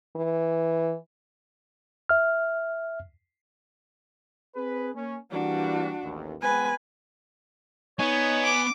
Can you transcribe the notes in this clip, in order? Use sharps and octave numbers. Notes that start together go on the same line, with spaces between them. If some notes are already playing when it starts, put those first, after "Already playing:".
E3
E5 F6
C4 G#4 B4
A#3 C#4
E3 G3 A#3 D4 F#4
A1 D#2
G#3 B3 C4 B4 G#5
B3 D#4 C#5 D5 G#5
D6